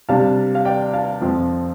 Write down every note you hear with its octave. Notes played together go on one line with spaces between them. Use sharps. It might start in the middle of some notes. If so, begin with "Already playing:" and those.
C3 G3 D4 F5 A5
F5
D5 G5
F5 A5
F2 F3 C4